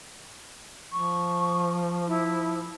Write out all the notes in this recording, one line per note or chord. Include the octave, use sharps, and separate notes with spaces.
F3 C#6
E4